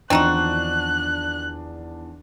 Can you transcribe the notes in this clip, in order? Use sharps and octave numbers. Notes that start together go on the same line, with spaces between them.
E2 D#3 F3 C4 D4 D#4 F#4 F#6